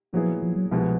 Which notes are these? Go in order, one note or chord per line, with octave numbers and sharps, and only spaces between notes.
A#2 F3 F#3 B3 E4 G#4
F3
F#3
C2 B2 F3 G#3 B3